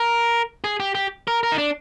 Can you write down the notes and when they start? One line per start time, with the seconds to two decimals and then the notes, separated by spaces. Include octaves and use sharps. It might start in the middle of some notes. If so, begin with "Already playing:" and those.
Already playing: A#4
0.64 G#4
0.80 G4
0.95 G4
1.28 A#4
1.43 A#4
1.52 D#4
1.58 D4